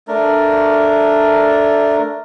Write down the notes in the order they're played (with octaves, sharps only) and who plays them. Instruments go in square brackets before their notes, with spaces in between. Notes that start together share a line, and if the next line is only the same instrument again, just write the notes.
[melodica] A3 D4 A#4